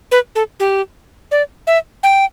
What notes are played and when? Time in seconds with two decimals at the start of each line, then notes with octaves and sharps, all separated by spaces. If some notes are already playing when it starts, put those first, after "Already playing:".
0.12 B4
0.35 A4
0.60 G4
1.31 D5
1.67 E5
2.03 G5